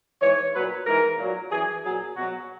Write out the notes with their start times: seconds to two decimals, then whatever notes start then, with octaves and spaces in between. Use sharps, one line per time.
0.21 G#2 E3 C#5
0.54 A#2 F#3 B4
0.87 G#2 E3 A#4
1.19 A#2 F#3
1.52 F#2 E3 G#4
1.84 A#2 F#3 G#4
2.17 B2 F#3 F#4